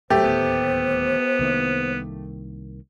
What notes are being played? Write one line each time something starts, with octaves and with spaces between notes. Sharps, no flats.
C#2 G2 F#3 A3 G4 C5
D1 D#2 A2 B3
C2 D#3 A#3